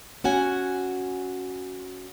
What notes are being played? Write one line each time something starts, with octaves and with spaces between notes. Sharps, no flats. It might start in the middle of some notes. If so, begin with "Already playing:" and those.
C#4 F#4 F#5 G#5